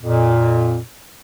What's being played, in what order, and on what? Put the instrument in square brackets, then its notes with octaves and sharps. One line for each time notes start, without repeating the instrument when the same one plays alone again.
[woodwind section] F2 A#2